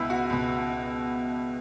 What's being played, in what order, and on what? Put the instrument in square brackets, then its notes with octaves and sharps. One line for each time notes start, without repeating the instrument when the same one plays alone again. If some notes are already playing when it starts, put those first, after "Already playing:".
Already playing: [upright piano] C#2 B2 B3 E4
F#4
C#2 B2